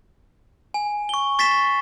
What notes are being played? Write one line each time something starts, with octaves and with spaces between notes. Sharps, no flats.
G#5
C#6 G7
C#6 A6 B6 C7 E7